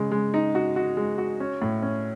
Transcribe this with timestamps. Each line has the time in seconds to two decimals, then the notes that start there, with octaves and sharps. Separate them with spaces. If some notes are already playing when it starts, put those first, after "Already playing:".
Already playing: C#3 G#3
0.11 G#3
0.34 D#4
0.55 F#4
0.76 F#4
0.97 G#3
1.18 F#4
1.40 C#4
1.62 A2
1.82 C#4